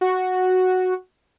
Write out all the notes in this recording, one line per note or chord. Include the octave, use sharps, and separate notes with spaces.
F#4